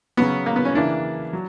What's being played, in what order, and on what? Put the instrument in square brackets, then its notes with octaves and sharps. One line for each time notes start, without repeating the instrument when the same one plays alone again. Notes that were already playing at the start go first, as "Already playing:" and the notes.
[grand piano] C#3 F#3 C#4 F#4 [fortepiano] B3
[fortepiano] A#3
B3
C#4
[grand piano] C#3 E3 A#3 E4 [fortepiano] D4
[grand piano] F#3